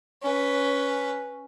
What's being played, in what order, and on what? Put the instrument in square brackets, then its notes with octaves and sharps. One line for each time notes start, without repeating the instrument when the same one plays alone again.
[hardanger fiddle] C#4 B4